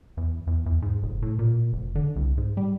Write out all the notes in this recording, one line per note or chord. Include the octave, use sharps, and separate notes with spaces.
E2
E2
E2
G#2
F1
A2
A#2
F1
D3
C2
G#2
G3